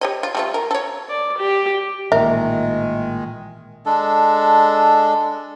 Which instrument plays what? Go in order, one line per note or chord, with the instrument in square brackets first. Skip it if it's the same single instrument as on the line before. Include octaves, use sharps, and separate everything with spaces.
[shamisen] G4 C#5 D#5
F4
G3 A3 F4
A#4
A4 C#5
[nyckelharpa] D5
G4
[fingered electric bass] A1 A#2 [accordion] D#3 G#3 [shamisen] A#4 [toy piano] E5
[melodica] G#3 D4 A4